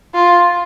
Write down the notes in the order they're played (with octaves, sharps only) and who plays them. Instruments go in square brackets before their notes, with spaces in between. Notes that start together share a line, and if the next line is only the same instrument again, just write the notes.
[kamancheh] F4